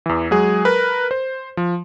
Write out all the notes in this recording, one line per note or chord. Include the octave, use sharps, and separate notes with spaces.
E2 E3
F#3 G#3 G#4
A#4 B4
C5
F3